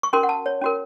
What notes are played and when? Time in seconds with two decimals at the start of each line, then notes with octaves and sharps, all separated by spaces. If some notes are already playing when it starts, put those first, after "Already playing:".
0.03 C#6
0.13 C#4 F#4 A#4 C6
0.23 F#5
0.29 A5
0.46 C#5
0.62 C#4 F#4 A#4